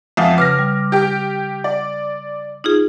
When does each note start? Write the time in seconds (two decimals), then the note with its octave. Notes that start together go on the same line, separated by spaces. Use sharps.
0.17 F2 F3 F4 E5 F#5 G#5
0.38 C#3 B4 D6 F6 A#6
0.59 G3
0.92 G4 G5
1.64 D5
2.64 D#4 F4 G#4